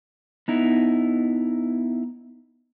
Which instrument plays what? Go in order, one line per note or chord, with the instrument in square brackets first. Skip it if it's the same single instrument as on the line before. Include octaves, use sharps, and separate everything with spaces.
[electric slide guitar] B3 D#4 E4